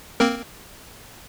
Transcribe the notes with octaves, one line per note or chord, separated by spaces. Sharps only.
A#3 C4 A#4